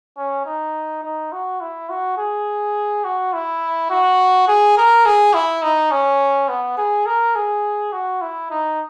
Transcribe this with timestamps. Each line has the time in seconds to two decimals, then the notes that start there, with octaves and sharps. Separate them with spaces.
0.17 C#4
0.46 D#4
1.03 D#4
1.32 F#4
1.61 E4
1.90 F#4
2.18 G#4
3.04 F#4
3.33 E4
3.90 F#4
4.48 G#4
4.77 A#4
5.06 G#4
5.34 E4
5.63 D#4
5.91 C#4
6.49 B3
6.77 G#4
7.06 A#4
7.35 G#4
7.92 F#4
8.21 E4
8.51 D#4